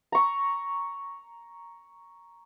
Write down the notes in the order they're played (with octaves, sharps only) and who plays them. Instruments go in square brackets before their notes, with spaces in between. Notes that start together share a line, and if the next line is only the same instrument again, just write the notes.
[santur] A#5 C#6